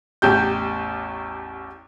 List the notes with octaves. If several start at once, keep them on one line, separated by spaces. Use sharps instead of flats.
A1 E2 G4 G6